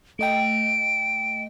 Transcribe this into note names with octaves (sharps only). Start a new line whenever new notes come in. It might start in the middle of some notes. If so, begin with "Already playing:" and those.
A3 D#5 G5 D7